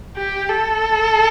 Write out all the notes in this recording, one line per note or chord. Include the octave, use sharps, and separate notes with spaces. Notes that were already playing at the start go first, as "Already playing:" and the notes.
G4
A4